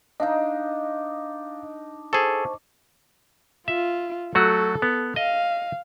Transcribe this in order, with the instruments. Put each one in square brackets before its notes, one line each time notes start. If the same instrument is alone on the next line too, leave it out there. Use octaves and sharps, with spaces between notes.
[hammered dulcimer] D4 D#4 [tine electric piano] D#5 F5
[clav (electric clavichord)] G#4 A4 [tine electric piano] C5 A5 C#6
[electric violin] F4 [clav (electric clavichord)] E5
[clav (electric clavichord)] F#3 A3 F#4 [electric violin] A4
[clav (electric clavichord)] B3
[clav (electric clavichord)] D#5 [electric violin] F5